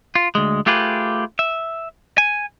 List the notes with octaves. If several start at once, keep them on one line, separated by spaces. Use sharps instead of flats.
F4
D2 G#3
A3 F4 G4 G#4 B4
E5
G#5